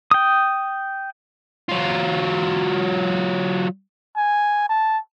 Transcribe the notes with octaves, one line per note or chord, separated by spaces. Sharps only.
G5 D#6
F#3 F4
G#5
A5